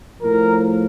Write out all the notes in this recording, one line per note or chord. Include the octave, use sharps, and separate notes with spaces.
A2 F3 A#4